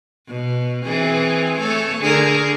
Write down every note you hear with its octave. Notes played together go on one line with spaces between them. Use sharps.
B2
E3 C4 G#4
A3 A4 C#5
D3 G#4 A#4